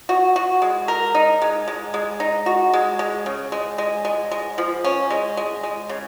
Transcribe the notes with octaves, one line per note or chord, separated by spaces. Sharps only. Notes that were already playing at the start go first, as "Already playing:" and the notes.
F#4
F#4
G#3
A#4
D#4
G#3
G#3
G#3
D#4
F#4
G#3
G#3
C#3
G#3
G#3
G#3
G#3
F3
C#4
G#3
G#3
G#3
C#3